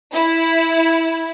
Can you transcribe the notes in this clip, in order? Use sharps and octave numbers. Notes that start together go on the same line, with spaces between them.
E4